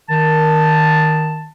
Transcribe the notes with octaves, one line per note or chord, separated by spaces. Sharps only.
D#3 A5